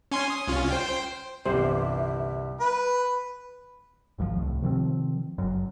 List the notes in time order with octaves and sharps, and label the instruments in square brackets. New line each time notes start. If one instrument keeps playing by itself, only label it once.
[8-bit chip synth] C#4 G#5 C6
D#6
C2 C#4 F4
C5 G5
[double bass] G1 E3 [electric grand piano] C2 [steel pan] G4 C5 [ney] E5
[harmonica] B4
[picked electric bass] G#1 D#2 D#3 F3
C2 A2
C3 D#3 F3 C4
F#1 F#2